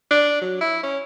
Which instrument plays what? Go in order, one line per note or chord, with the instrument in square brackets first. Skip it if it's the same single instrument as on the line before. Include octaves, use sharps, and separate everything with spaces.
[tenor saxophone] D4
F#3
E4
C#4